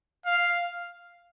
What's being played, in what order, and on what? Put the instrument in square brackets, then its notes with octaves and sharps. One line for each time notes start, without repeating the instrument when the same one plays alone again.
[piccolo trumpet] F5